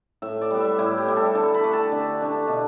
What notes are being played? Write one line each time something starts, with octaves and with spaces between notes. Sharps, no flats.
A2 E5
D5
G3 B3
E5
A2 E4
G4
G3 B3
A4
D3 A4
B5
A3 D4
A5
D3
A3 D4
B2